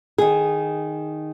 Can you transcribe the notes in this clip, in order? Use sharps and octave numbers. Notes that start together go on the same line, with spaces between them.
D#3 G#4